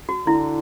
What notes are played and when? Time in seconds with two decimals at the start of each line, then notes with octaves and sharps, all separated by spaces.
0.09 F#4
0.27 D3 E4